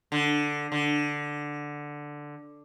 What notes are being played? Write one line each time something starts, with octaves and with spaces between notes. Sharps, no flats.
D3
D3